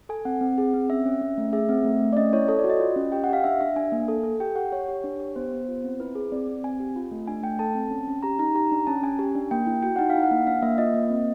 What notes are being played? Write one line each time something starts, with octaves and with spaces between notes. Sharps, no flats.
A4 G#5
C4 F#5
C4
G#4
C4
C#4 E5
C#4
C#4
A3
G#4 E5
C4
A3
A3
D5
C#4 D#5
E4 C#5
A4 C#5
D5
F#4
D#5
F4
C#4
G4 G5
F#5
G4 F5
D4 E5
D4 E5
D4 G#5
A#3
A4
A4
G4 G5
G4 F#5
G4 C#5
G4
D4
G4
B3 C5
B3
F4
C4
E4 B4
G#4
C4 D5
C4
C4 G#5
G4
F4
A3
D4 G#5
A3 G5
A4 A5
C4
C#4
C#4
G4 A#5
D#4 A#5
G4 A#5
D4
C#4 A5
C#4 G#5
G4
D4
A#3 G5
E4
F#4 G5
D#4 F#5
F5
E4
F#5
A#3
D4 F5
A#3 E5
F4 D#5
A#3
C4